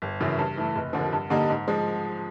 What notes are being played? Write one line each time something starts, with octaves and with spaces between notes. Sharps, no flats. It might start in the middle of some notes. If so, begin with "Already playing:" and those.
G1
F#2 C#3 E3
G2
E3 A3
F1
D#2 D3 F3
G2
D3 G3 A#3 D#4
G#2
F3 G#3